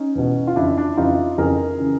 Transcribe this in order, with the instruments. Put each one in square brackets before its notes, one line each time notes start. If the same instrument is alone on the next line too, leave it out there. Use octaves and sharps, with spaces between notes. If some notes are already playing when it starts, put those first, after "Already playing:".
Already playing: [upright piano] C#4 D#4
E2 B2
F4
F2 C#3 E3 D4 E4
D4 E4
F2 C#3 E3 D#4 F4
F2 C#3 E3 G#4 A#4
C#3 E3